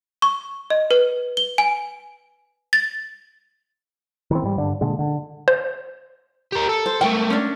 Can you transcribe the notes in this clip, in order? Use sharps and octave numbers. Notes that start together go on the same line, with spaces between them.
C#6
D#5
B4
G7
G#5
A6
D#3 E3 C4
G#2 G3
G2 D3 D4
A#2 D3 G#3
D3
C5
G4 A#4
A4
C5
A3 A#3 G5
C#4 D4